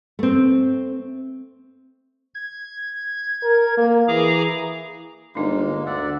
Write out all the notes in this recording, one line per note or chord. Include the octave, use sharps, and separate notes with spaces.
A3 C4
G#6
A#4
A#3
E3 G#4 A#5 D6
G1 G#3 A#3 D4 D#4
D2 D5 E5 F#5